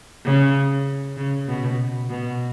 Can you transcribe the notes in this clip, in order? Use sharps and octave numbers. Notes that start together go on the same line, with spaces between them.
C#3
C#3
B2
B2